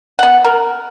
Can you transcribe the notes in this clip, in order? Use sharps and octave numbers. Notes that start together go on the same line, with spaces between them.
B3 F#5
A#4